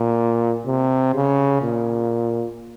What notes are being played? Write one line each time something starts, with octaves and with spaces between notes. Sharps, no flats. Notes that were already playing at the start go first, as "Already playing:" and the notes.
Already playing: A#2
C3
C#3
A#2